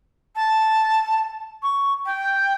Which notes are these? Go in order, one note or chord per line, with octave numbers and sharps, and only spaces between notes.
A5
C#6
G5